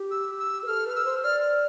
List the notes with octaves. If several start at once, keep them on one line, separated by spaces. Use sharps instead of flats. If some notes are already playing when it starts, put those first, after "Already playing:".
Already playing: G4
E6
E6
B4
A4 F6
B4 F6
E6
C5
D5 F6